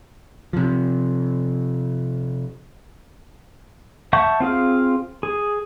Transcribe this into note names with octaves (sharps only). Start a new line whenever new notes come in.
C3 F3
E5 F#5 A5 C#6 G6
C4 F4 G#4 F5
G#4